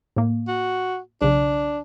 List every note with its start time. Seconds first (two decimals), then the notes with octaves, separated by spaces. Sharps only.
0.16 A2 A#3
0.48 F#4
1.22 B1 C#3 D4